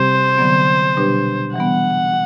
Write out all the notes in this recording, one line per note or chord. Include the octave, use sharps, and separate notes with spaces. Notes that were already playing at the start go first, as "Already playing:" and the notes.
Already playing: C3 G3 C4 G4 C5
D3 F#3 B3
B2 G3 D4 G4 B4
E3 G3 B3 F#5